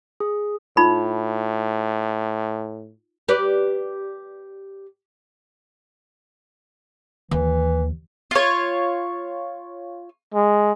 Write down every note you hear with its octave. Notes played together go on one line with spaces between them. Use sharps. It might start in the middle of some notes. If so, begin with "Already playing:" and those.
G#4
A2 D#4 F4 B5
G4 B4 D5
D#2 E3
F4 C#5
G#3